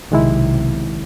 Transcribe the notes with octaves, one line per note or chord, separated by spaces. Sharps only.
B1 C3 D#3 G#3 E4